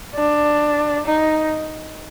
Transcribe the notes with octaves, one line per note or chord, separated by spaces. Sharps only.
D4
D#4